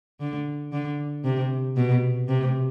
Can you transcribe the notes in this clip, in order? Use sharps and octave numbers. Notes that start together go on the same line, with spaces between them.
D3
D3
C3
B2
C3